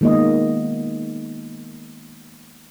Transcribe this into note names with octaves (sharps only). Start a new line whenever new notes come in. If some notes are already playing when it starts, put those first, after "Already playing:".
D#3 G#3 A#3 B3 D#5